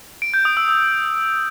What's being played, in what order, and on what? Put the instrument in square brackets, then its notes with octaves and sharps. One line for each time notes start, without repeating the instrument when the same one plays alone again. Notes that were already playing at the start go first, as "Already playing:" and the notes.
[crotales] D7
G6
D#6
E6
E6